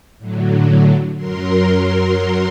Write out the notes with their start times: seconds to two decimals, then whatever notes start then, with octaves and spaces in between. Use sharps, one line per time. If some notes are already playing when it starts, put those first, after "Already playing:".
0.18 A2 D3 F#3
1.16 F#2 F#3 A#4 C6